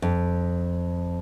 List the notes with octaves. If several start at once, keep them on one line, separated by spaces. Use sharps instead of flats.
F2